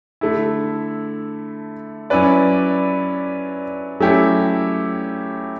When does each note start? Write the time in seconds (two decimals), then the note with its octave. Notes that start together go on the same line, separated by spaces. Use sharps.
0.21 D3 A3 E4
2.10 F#3 C#4 E4 B4 D5
4.00 F#3 A3 C#4 E4 G4